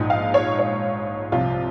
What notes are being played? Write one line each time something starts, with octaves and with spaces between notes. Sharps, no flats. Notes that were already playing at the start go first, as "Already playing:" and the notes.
Already playing: A#1 G#2 F3 G#3
F5
C#5
C#5
C2 C3 F3 F4